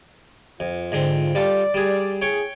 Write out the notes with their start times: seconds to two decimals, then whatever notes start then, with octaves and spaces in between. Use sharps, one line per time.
0.60 F2 F4
0.92 G#2 D3 C4
1.35 G3 F4 A4 D5
1.74 G3 G#4
2.22 A2 G#4 C#5 G5 C#6